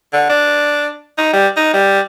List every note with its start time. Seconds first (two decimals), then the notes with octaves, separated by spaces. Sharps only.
0.13 D3
0.29 D4
1.18 D#4
1.33 G3
1.56 D#4
1.73 G3